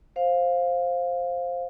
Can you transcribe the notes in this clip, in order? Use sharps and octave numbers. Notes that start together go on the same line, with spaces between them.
C5 F5